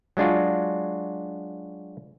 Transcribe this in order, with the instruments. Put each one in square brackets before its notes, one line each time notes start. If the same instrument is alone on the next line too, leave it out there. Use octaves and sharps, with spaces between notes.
[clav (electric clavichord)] F#3 G#3 D4 F4 F#4